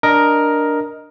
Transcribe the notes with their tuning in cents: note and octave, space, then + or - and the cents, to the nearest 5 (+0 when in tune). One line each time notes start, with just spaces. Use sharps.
D4 +0 A#4 +10 D#5 +0